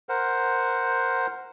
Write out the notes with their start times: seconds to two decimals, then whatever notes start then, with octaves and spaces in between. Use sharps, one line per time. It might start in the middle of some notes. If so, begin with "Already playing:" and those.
0.09 A#4 C5 F#5